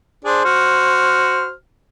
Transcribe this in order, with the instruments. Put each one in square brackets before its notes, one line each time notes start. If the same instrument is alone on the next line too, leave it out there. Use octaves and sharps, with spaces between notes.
[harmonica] D4 G#4 [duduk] C5
[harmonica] F#4 F6